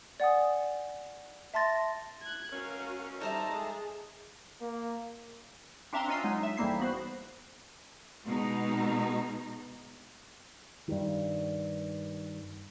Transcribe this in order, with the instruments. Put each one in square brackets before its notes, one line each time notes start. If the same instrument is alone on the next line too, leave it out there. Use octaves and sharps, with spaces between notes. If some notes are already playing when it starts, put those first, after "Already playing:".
[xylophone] D5 F#5 G#5 D#6
E5 A5 C6 A6 A#6
[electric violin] F#6 G#6
[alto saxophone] C#4 [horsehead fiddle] F#4 [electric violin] A#4 F5
[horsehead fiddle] G3 A#5 [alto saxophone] D#4 [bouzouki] A4 C5 E5 [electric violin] A5
[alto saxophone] G#3 [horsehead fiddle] G#4
[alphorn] A#3
[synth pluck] C4 D4 E5 F5 A#5 C6
C#4 F4 D#5 E6 C7
F#3 G#3 D#4
E5
A1 G#2 G3 A#3 E4 C7
B3 F#4 C5
[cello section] B2 G#3 D#4
[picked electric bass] G2 D#3